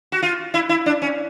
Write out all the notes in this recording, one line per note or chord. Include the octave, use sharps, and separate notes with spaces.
F#4
F4
E4
E4
D4
C#4